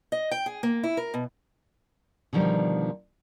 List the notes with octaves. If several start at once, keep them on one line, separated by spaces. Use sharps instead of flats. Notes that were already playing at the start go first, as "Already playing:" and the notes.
D#5
G5
G#4
A#3
E4
A#4
B2
B2 D3 D#3 F3 G3